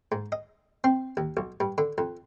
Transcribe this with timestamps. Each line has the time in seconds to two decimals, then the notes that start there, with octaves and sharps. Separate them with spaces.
0.12 G#2
0.32 D#5
0.84 C4
1.17 D#2
1.37 B1
1.60 G2
1.78 D3
1.98 F2